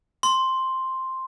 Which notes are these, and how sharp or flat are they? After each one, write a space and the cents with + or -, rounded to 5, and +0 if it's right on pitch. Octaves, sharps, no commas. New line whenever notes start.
C6 +5